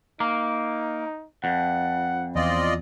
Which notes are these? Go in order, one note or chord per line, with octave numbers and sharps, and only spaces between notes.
A#3 D#4
F2 F#5
E2 C4 F4 D5 D#5